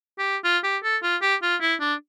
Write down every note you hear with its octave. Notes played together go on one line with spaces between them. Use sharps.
G4
F4
G4
A4
F4
G4
F4
E4
D4